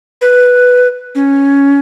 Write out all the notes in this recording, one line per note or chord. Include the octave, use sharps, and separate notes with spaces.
B4
C#4